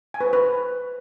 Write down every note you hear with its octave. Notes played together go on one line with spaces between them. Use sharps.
G#5
B4
C5
B4